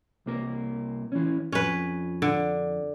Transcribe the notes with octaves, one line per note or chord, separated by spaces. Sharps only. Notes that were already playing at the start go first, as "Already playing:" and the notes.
C2 A#3 A#4
E3 C#4
F2 C#4 B4
D3